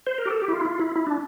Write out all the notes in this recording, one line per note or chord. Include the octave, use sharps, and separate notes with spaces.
C5
A#4
G4
A4
G4
E4
F4
E4
F4
E4
E4
D4